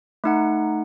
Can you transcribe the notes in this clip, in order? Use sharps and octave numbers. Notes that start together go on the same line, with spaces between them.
A3 D#4 F#5